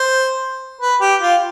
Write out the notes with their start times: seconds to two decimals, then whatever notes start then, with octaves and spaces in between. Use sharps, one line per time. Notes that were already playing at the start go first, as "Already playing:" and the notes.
Already playing: C5
0.81 B4
1.01 G4
1.21 F4